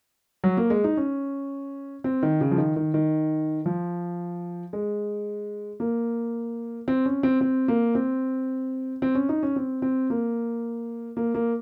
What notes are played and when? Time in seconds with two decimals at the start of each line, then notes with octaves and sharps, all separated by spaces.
0.44 F#3
0.57 A#3
0.70 G#3
0.84 D#4
0.97 C#4
2.04 C4
2.23 D#3
2.41 C#3
2.51 F3
2.58 D#3
2.76 D#3
2.94 D#3
3.66 F3
4.73 G#3
5.80 A#3
6.88 C4
7.06 C#4
7.23 C4
7.41 C4
7.68 A#3
7.95 C4
9.02 C4
9.15 C#4
9.29 D#4
9.43 C#4
9.56 C4
9.82 C4
10.10 A#3
11.17 A#3
11.34 A#3